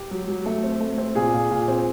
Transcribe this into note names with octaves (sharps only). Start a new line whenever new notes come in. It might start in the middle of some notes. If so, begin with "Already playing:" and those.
Already playing: G4
F#3
F#3
A3
C4
A3
C4
A#2 G#4
A#2
A#2
C4